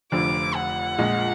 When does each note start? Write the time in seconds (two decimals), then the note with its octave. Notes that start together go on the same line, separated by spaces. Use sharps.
0.12 F1 F2 D3 F3 D6
0.55 F#5
0.98 A#1 A#2 G#3